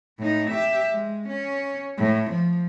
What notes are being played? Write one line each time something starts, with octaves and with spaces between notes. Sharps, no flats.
A2 D#4
G4 E5
G#3
C#4
A2
F3